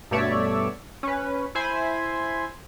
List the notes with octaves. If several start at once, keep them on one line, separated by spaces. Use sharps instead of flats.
G2 B2 A3 C#5 D5 E5
C#4 B4
E4 C5 G#5 B5